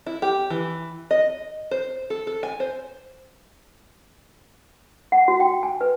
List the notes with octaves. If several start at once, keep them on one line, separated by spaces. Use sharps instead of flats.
E4
G4
E3
D#5
C5
A4
A4
G#5
C5
F#5
F#4
G5
G#5
B4